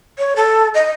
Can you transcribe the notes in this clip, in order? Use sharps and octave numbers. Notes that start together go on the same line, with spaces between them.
C#5
A4
D#5